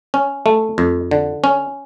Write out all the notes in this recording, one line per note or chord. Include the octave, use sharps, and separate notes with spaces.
C#4
A3
F2
D3
C#4